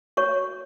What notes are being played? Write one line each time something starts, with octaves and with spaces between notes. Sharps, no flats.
F#4 C#5 C#6